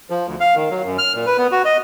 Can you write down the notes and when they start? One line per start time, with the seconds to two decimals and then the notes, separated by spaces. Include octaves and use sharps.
0.10 F3
0.27 D2
0.40 F5
0.56 D#3
0.71 F#3
0.85 F#2
0.98 F6
1.15 A#2
1.26 B4
1.38 B3
1.52 F#4
1.65 D#5